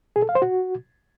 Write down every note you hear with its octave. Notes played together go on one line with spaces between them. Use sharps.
G#4
A4
F5
C5
F#4